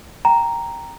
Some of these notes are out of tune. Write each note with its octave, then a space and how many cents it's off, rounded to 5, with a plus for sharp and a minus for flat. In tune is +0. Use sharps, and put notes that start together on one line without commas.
G5 +0 A#5 +0